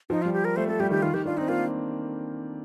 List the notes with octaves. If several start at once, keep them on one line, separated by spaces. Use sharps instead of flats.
F3 D#4
G3 F4
G4
A#4
A3 C5
A3 A4
G3 G4
D#3 G4
D#3 F4
D#3 G4
D4 F4
C4 D#4
A#3 F4